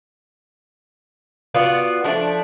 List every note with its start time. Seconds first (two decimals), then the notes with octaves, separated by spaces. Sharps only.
1.54 B3 F4 F#4 D5
2.04 F3 A3 D4 D5